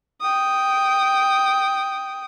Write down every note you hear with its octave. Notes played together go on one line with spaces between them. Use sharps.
G5 D#6